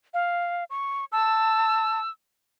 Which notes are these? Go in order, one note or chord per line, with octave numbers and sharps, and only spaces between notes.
F5
C#6
A5 E6